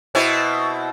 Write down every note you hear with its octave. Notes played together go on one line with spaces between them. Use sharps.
B2 C4 E4